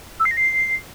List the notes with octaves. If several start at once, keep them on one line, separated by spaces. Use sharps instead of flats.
E6
C7
A#6
C7